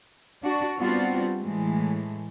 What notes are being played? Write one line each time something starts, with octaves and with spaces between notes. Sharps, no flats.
D4 F#4
G3 B3 C4 D4 F4 F#4
A2 E3 G#3 A3